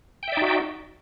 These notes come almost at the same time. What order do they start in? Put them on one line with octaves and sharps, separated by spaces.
G5 E5 D5 D#4 F#4